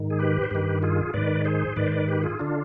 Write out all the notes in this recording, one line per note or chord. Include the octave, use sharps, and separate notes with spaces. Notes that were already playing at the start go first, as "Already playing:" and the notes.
Already playing: G#2 D#3
G#4
G4 B4
C5
G2 D#3 G4 B4
F4 G#4
G#2 D#3 B4 D5
G#4 C5
G#2 D#3 B4 D5
C5
B4 D5
G4 B4
F4 G#4
D3 D4 F4